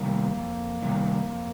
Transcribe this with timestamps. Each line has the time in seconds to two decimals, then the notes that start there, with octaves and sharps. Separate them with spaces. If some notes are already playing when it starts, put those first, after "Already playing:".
Already playing: C3 D#3 G3 A#3
0.36 F2
0.82 C3 D#3 G3
1.27 F2